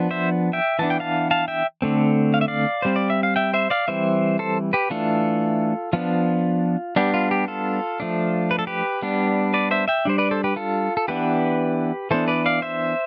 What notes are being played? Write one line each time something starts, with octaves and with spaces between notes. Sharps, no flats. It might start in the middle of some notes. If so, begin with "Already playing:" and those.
Already playing: F3 B3 D4
C5 E5
E5 G5
E3 B3 D4 A5
G5
F5 A5
F5 A5
E5 G5
D3 A3 C4
F5
E5
D5 F5
G3 C4 C5
D5
E5
F5
E5 G5
C5 E5
D5 F5
E3 G3 C4 C5 E5
A4 C5
G4 B4
E3 A3 D4 F4 A4
F3 B3 D4 F4
G3 B3 D4 G4
F4
G4
F4 A4
F3 A3 D4
B4
A4
G4 B4
G3 B3 D4
B4 D5
C5 E5
E5 G5
G3 D4 C5
B4 D5
A4 C5
G4 B4
F4 A4
A4
E3 B3 D4 G4 B4
E3 B3 D4 A4 C5
B4 D5
D5 F5
C5 E5